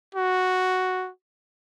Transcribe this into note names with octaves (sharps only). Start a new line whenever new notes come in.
F#4